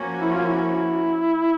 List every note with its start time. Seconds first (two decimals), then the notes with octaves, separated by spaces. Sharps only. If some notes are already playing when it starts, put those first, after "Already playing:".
Already playing: F3 A#3 C#4 F#4
0.21 E4
0.34 F4
0.47 E4